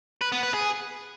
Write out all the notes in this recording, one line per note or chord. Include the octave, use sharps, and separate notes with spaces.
B4
B3
B4
G#4